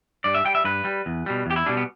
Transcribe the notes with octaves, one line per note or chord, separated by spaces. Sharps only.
G2 D5
E5
G3 G5
E5
G2 B4
G3
E2
B2 G3
E2 G4
E4
B2 G3 D4
B3